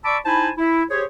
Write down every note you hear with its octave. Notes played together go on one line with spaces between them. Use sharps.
D5 A5 B5 C#6 D6 E6
D#4 E4 C5 G#5 A5 B5
E4
G4 G#4 C5 C#5